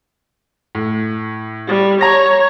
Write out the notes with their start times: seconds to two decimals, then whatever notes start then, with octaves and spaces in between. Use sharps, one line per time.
0.75 A2
1.68 G3
2.01 C#5 A#5 A#6